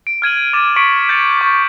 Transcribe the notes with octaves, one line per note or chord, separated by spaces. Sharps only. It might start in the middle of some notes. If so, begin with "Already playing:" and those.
D7
F6 G#6 D#7 F#7
D6 A6 D7 E7
C#6 B6 C#7 D7 F#7
G6 A6 B6 C#7 D#7 F7
C#6 D6